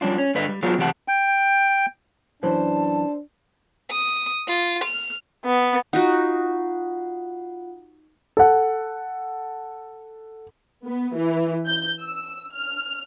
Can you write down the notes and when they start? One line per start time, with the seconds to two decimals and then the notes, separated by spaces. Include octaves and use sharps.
0.01 F3 G3 C#4 D4 F4
0.18 C#4
0.35 G2 D3 B4 D#5 F5
0.48 G3
0.63 F#3 B3 D4 F4 G#4
0.78 C3 E3 A3 G4 F#5 A5
1.08 G5
2.43 F#2 E3 D4 C5 A5
3.91 D#6
4.48 F4
4.84 F6
5.45 B3
5.93 D#4 F4 F#4 F#5
8.37 A4 F#5
10.85 B3
11.15 E3
11.66 G6
12.00 E6
12.52 F6